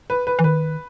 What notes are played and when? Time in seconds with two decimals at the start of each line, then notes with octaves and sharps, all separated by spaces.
0.10 B4
0.27 B4
0.39 E3
0.44 D#3 B4